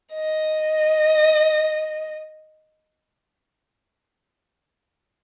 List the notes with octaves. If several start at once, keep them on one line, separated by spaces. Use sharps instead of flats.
D#5